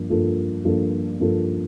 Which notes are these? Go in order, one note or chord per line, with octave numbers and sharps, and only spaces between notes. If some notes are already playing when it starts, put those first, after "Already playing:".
Already playing: G2 F3 A#3
G2 F3 A#3 F4 A4
G2 F3 A#3 F4 A4
G2 F3 A#3 F4 A4